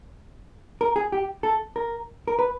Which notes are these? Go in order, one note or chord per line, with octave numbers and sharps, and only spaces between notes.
A#4
G#4
G4
A4
A#4
A#4
B4